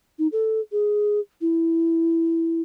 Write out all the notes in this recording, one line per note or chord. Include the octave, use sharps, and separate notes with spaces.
D#4
A4
G#4
E4